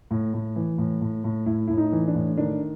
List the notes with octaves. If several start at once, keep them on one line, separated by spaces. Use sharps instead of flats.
A2
A2
E3
A2
A2
A2
A2 E4
A2 E4
D#4
E3
D4
A2
D#3 D4